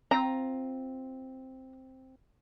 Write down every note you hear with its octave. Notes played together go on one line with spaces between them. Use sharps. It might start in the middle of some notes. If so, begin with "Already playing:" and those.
C4 F4 A#5